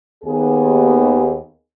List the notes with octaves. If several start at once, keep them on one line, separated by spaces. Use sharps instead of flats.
D#2 B3 G#4